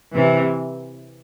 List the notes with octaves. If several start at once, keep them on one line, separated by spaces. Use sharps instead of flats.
C3 E3